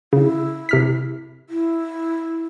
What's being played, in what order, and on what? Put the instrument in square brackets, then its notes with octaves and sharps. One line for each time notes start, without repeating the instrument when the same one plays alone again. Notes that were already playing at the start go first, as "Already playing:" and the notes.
[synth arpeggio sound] C#3 [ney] E4
[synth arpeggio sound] C3 F6 B6
[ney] E4